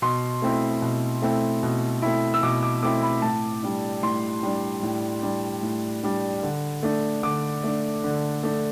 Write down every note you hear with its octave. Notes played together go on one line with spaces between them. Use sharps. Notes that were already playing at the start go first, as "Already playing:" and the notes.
B2 C6
A3 C4 E4
B2
A3 C4 E4
B2
A3 C4 E4
E6
B2 D6
D6
A3 C4 E4 D6
B5
A2 A5
G3 D4
A2 C6
G3 D4
A2
G3 D4
A2
G3 D4
D3
A3 D4
D3 D6
A3 D4
D3
A3 D4